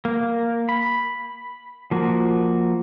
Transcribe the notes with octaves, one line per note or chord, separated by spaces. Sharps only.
A#3
B5
F3 A#3 F#4